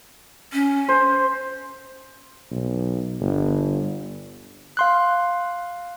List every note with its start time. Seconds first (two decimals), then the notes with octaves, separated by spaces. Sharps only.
0.53 C#4
0.88 C5
2.51 B1
3.21 G1
4.77 F5 C6 F#6